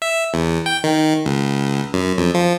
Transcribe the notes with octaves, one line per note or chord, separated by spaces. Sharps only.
E5
E2
G5
D#3
C#2
F#2
F2
F3